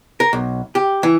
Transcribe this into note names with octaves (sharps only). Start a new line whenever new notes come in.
A#4
B1
G4
E3